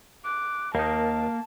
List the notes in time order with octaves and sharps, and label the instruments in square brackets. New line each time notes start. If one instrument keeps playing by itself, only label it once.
[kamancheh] D6 [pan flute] F#6
[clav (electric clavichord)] D#2 D#4 [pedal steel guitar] A#3 [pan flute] A#4 [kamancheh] A5